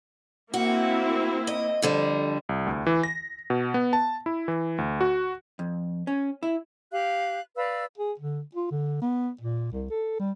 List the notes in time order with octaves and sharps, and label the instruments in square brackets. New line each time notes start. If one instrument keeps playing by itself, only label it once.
[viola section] A#3 C4 E4 [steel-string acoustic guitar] F#4
[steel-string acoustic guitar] D#5
F2 D3 G3
[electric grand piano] C2
D2
E3
A#6
B2
B3
A5
E4
E3
D2
F#4
[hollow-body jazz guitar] F2
C#4
E4
[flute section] G4 F5 F#6
B4 D5 F5 E6
[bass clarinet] G#4
D3
F4
D3
B3
A#2
C2
A4
G3